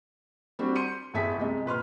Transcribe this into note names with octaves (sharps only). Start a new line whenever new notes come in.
G3 C4 D4 F#4
C6 G6 C#7 D#7
A1 B3 G#4 E5 A5 B6
C2 G#3 D#5
A#1 B4 C6 F6